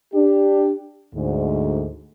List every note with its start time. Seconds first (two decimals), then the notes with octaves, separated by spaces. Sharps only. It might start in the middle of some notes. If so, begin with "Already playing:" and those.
0.14 D4 G4
1.15 D2 G#2